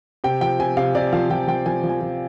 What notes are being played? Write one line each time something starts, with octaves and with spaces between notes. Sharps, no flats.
C3 G5
F3 G5
C3 G#5
C3 F5
C3 D5
F3 F5
F3 G5
F3 G5
F3 G#5
F3
G#5
F3